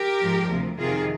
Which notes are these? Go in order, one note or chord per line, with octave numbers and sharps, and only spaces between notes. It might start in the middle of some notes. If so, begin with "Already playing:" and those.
Already playing: G4 A#4
G#2 F3
D2 C3 F3
F2 C3 D#3 F4 G#4